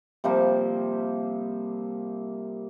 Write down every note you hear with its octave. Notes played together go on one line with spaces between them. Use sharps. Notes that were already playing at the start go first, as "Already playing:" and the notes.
C3 F3 G3 A#3